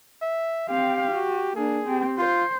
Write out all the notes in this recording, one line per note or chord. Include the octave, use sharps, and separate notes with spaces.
E5
C4 G4 F5
F#4
A#3 D4 G#4
C4 G4
F4 C5